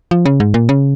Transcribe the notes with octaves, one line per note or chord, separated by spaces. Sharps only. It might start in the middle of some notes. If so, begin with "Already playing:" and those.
F3
C#3
G#2
A#2
C#3